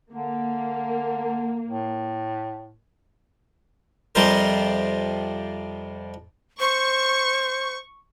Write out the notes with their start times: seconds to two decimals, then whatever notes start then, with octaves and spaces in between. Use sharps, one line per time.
0.12 D3 A#3
1.67 A2
4.15 F2 C3 F3 G3 A#4 C5
6.60 C5 C#6